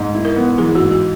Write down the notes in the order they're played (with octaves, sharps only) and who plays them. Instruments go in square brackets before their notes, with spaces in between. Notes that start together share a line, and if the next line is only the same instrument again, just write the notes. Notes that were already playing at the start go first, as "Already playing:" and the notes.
Already playing: [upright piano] G#2
E4
[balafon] A#4
[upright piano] B3
[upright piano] E3 [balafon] G#4
[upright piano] G#2 [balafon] F#4
[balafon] F#4